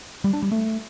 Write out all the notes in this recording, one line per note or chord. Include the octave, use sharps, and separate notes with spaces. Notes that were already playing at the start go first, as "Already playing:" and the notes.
G3
D4
G3
A3